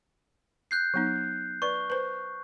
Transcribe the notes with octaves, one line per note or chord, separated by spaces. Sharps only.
F#6 G6 C7
F#3 B3 D#4
B4 D5 C#6
B4 C5